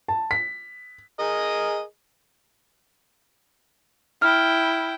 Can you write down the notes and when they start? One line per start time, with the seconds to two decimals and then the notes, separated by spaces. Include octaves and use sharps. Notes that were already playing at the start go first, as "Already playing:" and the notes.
0.08 A5
0.31 B6
1.19 G#4 A#4 D#5
4.22 E4 G5 F6